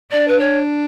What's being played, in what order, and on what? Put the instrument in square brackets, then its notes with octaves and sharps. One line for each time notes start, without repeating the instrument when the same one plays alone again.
[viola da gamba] D4 [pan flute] D5
[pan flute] B4
C#5